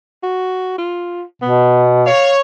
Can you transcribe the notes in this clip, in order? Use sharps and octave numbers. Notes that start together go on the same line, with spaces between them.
F#4
F4
B2 B3
C#5 F5